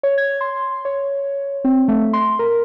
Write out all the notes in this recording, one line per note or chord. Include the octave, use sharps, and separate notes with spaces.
C#5
G#6
C6
C#5
C4
A3
C6
A#4